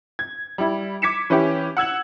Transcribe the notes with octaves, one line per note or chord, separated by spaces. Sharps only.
G#6
G3 E4
D6 G#6 B6 C#7 E7
E3 C#4 E4 G4
F#5 E6 G#6 F#7